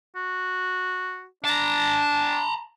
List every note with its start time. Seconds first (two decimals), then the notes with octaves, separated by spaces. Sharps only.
0.16 F#4
1.45 D4 A5 A#5